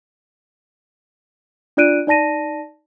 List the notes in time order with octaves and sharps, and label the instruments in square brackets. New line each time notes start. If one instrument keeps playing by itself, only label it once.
[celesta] D4 F4 D5 F#6 D7 D#7
D#4 D5 A5 A#6 D#7